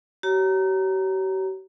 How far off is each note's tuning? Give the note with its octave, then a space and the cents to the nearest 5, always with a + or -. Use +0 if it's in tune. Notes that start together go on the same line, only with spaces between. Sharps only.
G4 -45 C#5 +0 A#5 +0